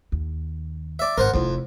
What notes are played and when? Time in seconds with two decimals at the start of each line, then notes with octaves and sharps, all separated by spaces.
0.12 D#2
0.99 D5 E5
1.18 G#1 A#4 C5 F#5
1.34 F1 F2 E4